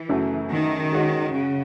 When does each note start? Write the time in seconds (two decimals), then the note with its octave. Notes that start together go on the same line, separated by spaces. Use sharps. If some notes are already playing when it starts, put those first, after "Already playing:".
Already playing: E3
0.09 F#2 C#3 F#3 A3
0.51 D#3
0.92 G#3 C#4 F#4
1.33 C#3